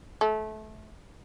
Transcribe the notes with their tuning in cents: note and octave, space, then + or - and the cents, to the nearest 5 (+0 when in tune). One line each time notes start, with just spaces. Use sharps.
A3 -25